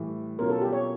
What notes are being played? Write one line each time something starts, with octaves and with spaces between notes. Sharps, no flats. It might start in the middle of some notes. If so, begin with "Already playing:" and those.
Already playing: A2 E3 G3
B2 F#3 A#3 C#4 F4 A#4
A4
G4
C#5